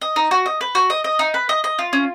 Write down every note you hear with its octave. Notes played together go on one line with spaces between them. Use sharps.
D#5
D#4
F#4
D#5
B4
F#4
D#5
D#5
D#4
B4
D#5
D#5
F4
C#4